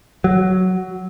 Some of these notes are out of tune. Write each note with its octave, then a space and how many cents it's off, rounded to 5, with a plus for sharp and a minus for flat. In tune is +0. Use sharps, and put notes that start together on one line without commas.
F#3 +10